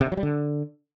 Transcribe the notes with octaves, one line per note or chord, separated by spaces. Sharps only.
C3
D3
F#3
G3
D3